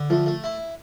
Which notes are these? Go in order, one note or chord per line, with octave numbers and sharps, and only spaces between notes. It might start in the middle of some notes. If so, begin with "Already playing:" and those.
Already playing: D3
F3 A3
A3
E4